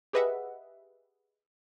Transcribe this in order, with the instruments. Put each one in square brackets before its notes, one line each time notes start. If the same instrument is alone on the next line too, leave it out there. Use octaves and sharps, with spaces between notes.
[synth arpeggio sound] G4 G#4 B4 D#5 E5 F#5